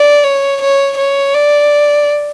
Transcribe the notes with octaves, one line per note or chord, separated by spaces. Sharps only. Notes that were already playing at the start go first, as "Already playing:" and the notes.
Already playing: D5
C#5
C#5
C#5
D5